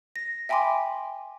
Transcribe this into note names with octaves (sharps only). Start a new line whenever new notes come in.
A#6
E5 G5 G#5 B5 C6 D6